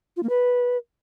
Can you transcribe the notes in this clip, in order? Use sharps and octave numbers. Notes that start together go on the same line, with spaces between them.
F4
A#3
B4